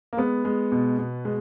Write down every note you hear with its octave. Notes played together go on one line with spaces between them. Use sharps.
A#3
G#3 B3
G#3
B2
B2
G#3